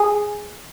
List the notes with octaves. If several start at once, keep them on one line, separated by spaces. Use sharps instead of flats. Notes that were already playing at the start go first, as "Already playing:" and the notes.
Already playing: G#4